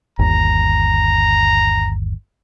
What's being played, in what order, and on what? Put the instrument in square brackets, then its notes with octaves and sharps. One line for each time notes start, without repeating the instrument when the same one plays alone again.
[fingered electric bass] G1 D#2 [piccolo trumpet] A#5